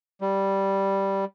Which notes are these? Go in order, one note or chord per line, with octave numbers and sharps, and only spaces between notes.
G3